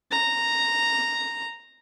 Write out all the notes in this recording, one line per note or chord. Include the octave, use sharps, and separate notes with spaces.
A#5